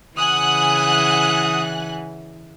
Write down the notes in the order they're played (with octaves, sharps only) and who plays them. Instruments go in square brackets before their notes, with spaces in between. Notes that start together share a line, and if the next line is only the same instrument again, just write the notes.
[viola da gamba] C#3 E3 [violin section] F#5 G#5 F#6 [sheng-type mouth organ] D#6